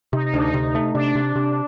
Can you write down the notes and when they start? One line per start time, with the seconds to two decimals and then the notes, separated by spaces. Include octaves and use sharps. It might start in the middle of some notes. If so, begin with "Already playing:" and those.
0.13 C3 D#4
0.26 D#4
0.34 D2 D4
0.41 D#4
0.54 C3
0.75 A3
0.94 C3 D4
1.15 C3
1.36 C3